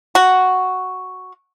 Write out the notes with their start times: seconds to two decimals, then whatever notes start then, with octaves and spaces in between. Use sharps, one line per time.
0.15 F#4